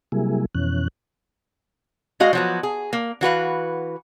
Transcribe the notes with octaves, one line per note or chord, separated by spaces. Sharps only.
C3 F#3 G3 A#3 E4 G#4
F2 B2 E3 C#4 F#6
G#3 F#4 D#5 F5
F3 F#3 B3
G#4
A#3
E3 F#4 B4 F5